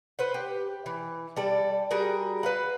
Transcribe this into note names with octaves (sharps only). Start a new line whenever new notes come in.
B4 C5 F#5
G4
E3
G3 A4 D5
G3 F#4 G#4 A#4
B4 F5 F#5